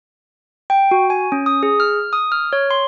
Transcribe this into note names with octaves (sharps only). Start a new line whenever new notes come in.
G5
F#4
G#5
C#4
D#6
G#4
F6
D#6
F6
C#5
C6